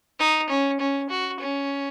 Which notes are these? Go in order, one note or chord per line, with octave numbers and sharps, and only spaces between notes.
D#4
C#4
C#4
F#4
C#4